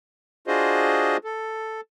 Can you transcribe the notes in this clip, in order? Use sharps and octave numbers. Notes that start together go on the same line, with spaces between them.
D4 F4 F#4 G#4 C5 D#5
A4